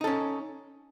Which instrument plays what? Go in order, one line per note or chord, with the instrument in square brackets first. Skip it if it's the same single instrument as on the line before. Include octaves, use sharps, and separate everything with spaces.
[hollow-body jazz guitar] D#4
A4
C#4